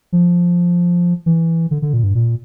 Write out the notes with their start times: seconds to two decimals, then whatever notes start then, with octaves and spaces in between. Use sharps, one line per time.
0.12 F3
1.26 E3
1.71 D3
1.82 D3
1.93 A#2
2.03 G2
2.15 A#2